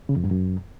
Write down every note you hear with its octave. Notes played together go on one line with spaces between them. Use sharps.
C#3
F2
G2
F#2